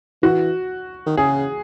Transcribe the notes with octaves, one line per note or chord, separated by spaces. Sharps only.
E3 F#4
D#3
C#3 G#4